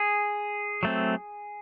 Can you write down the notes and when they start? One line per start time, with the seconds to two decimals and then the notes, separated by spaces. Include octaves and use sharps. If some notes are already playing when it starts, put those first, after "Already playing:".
Already playing: G#4
0.83 F#3 A3 C4